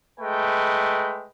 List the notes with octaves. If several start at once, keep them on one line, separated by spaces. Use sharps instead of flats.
G#3 A3 B4 G5